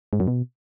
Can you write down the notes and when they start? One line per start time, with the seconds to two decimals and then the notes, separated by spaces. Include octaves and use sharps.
0.13 G#2
0.20 F#2
0.27 B2